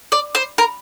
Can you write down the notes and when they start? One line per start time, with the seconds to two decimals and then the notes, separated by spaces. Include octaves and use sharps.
0.12 D5
0.35 C5
0.58 A#4